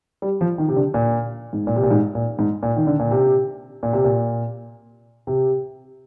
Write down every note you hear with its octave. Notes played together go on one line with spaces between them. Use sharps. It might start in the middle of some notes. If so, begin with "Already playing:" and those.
G3
F3
D#3
C3
D3
A#2
G#2
A#2
C3
A#2
G#2
A#2
G#2
A#2
D#3
D3
A#2
C3
A#2
C3
A#2
C3